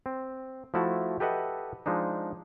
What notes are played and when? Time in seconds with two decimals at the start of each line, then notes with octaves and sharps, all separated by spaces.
0.06 C4
0.74 F3 A3 E4 F#4 A5
1.20 G4 A4 B4 D#5 E5 F#5
1.86 F3 G#3 D4 D#4